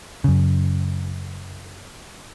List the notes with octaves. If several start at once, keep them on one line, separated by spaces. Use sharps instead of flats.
F#2 C#3